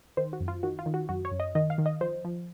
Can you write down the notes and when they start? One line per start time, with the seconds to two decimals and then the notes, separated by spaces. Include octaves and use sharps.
0.17 D#3 C5
0.33 F#4
0.40 F#2
0.48 F4
0.63 D#3 F#4
0.79 F4
0.86 D#3
0.94 F#4
1.09 F#2 F#4
1.25 C#5
1.31 F#2
1.40 D#5
1.55 D#3 D#5
1.70 F5
1.78 D#3
1.86 D#5
2.01 F3 C5
2.25 F3